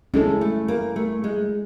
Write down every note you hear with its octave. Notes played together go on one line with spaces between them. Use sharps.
G#3 C#4 E4 A4
A3
A#3
A3
G#3